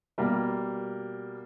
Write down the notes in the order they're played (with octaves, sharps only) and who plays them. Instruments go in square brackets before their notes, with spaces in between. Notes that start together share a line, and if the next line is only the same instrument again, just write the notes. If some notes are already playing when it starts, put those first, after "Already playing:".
[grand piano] B2 G3 A#3